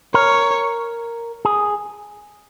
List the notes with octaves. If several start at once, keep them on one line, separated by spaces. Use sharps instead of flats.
A#4 C#5
G#4